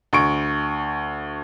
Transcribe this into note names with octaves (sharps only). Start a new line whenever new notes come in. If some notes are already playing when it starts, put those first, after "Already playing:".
D2 C#6 D7